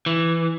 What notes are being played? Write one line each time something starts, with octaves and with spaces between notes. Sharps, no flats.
E3